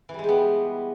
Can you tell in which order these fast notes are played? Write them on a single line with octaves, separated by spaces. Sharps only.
E3 G3 G#3 G4 B3